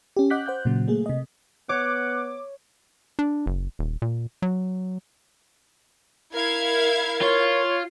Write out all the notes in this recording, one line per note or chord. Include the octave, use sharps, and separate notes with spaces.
C#4 G4
D#5 F#5 D6 F#6 G6 B6
C5 F#5 F#6 G6
A#2 C#3 F#3
A3 A#3 G#4
C3 D#5
B3 C#5 F#5 D6
D4
F#1
D#1
A#2
F#3
E4 A#4 F5 G#6
F4 C#5